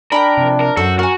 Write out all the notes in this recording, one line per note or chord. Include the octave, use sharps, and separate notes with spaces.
D4 A#4 G5 A5 B5
C3 F3
A#4
F#2 F#4 A4 C5 A5
F#4 A#4 G#5